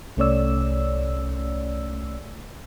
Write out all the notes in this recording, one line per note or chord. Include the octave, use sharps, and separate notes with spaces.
C2 A3 C#4 C#5 D5 E6